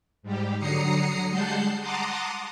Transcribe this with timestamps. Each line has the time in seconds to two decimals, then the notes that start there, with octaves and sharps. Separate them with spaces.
0.23 G#2 G3 G4
0.59 D3 F#3 A#5 D#6 C7 C#7
1.30 G3 G#3 F#5 A5 G6 C7
1.81 F#5 A5 A#5 C6 D6 D#6